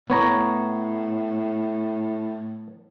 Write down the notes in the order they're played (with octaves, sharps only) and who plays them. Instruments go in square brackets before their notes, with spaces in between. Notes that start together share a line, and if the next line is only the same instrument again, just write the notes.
[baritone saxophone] A2 [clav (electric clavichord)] B3 C#5 A#5